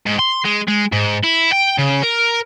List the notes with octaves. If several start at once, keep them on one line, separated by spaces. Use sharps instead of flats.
G#2
C6
G#3
G#3
G#2
E4
G5
C#3
A#4